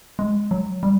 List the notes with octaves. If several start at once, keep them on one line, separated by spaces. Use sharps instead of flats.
G#3
F#3
G3